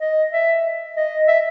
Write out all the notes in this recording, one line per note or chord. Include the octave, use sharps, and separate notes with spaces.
D#5
E5
D#5
E5